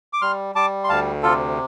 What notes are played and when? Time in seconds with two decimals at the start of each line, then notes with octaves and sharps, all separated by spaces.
0.13 D6
0.21 G3 C6 F6
0.55 G3 A5 D6
0.84 C6
0.89 D2 F5 A5
1.23 C3 F4 A4